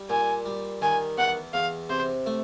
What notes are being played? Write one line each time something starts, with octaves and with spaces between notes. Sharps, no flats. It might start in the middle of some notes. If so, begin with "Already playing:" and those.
Already playing: G3
A#2 G#5
G3
D#3 G#5
E2 F#5
E2 F5
C3 C5
A3